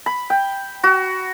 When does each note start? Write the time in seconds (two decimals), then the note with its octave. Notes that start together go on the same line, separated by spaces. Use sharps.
0.06 B5
0.30 G5
0.83 F#4